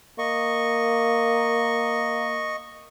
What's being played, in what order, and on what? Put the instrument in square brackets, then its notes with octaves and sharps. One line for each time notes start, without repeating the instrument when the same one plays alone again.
[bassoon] A#3 [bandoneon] D#5 C#6